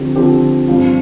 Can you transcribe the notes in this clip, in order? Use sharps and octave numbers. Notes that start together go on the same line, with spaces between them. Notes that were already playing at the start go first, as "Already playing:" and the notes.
Already playing: D3 F3 C4 G4
D3 F3 C4 G4
G2 F3 C4 F4